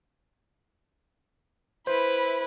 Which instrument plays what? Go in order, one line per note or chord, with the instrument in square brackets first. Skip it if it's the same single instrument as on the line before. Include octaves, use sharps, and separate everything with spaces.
[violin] E4 B4 [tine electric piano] C5